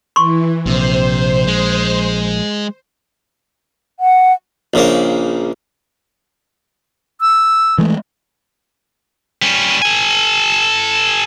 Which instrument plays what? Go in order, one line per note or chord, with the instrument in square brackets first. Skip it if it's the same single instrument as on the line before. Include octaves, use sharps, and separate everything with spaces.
[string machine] E3 [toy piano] C6 C#6
[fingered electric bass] A#1 [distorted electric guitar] C3 [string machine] C5
[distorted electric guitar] G#3
[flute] F#5
[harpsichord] A#1 C#3 A#3
[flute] E6
[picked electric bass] E3 G#3 A3
[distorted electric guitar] G3 C#4
A4 G#5